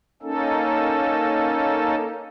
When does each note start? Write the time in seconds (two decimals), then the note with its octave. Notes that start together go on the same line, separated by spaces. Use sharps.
0.22 A#3 C#4 D#4 A4